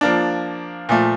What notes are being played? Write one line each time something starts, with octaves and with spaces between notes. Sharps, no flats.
F3 A#3 D4
A#2 F3 A3